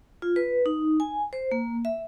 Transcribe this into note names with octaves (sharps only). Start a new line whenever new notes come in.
F4
B4
D#4
G#5
C5
A#3
E5